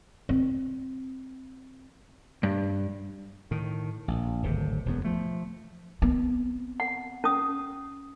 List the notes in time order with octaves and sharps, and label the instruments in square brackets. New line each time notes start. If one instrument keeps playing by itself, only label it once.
[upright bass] C4
[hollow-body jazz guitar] G2
[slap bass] A2 D#3
A#1
D1 G#1 C3
E1 F#2 B3
F3 A3
[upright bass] B3 C4
[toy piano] F#5
C#4 D#6